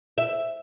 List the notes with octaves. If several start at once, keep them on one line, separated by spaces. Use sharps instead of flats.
E5